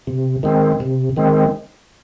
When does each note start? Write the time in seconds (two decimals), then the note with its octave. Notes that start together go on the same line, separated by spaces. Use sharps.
0.07 C3
0.43 D#3 G#3 C4
0.80 C3
1.17 D#3 G#3 C4